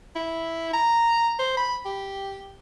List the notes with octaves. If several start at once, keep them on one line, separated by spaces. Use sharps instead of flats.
E4
A#5
C5
B5
G4